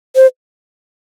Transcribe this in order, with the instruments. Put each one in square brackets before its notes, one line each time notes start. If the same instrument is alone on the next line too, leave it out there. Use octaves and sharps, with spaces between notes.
[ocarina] C5